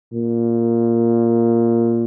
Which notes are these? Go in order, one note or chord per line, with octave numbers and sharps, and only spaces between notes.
A#2